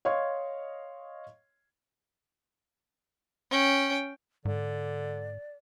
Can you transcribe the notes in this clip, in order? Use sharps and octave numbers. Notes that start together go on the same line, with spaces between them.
C#5 D#5 F5 C6 C#6 G#6
C#4 G5
G#2 D3 D5